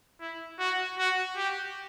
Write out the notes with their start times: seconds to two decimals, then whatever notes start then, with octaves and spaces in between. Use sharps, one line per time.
0.21 E4
0.59 F#4
0.98 F#4
1.37 G4